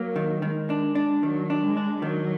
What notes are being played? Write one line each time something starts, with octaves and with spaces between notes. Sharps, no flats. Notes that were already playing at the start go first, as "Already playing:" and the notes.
Already playing: F#3 A#3
D#3
D#3 G#3
D4
D4
D#3 F#3
D4
G#3
D4
D#3 F#3